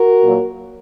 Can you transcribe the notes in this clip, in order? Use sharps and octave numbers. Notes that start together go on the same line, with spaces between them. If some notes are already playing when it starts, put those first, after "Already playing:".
Already playing: F#4 A#4
A#2 F#3 A#3